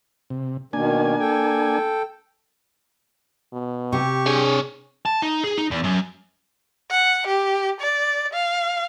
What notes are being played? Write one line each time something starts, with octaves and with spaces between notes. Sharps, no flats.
C3
B2 D#3 A#3 D4 G#5
A4 G5
B2
C3 G4 C#6
D4 G#4 C#5
A5
D#4
G#4
D#4
E2
F#2
F#5
G4
D5
F5